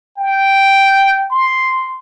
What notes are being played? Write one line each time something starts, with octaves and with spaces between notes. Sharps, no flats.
G5
C6